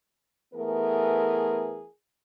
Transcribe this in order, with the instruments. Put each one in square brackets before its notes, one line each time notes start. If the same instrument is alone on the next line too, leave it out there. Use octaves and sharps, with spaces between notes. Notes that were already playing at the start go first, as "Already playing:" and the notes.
[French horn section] E3 A3 B3 G#4 A#4